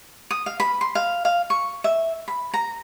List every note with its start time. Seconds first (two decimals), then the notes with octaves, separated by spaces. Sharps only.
0.31 D#6
0.46 F5
0.60 B5
0.81 C6
0.95 F5
1.25 F5
1.50 C#6
1.84 E5
2.28 B5
2.54 A#5